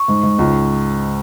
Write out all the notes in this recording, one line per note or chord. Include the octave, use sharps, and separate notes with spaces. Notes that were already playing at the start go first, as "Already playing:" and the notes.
Already playing: C#6
G#2
G#2
C#2